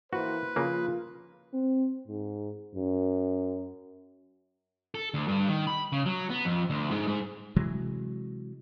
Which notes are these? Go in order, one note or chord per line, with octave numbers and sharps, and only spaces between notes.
E3 A#3 F#4 B4 C5
C#3 F3 A#3 F4
C4
G#2
F#2
A4
D2
G2
D#3
B5
C#3
F#3
B3
F2
D2
G#2
G#2
C3 E3 F#3 G#3